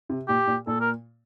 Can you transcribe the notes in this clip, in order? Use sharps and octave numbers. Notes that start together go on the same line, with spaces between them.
C3
A#2 G4
A#2
A#2 A4
A#4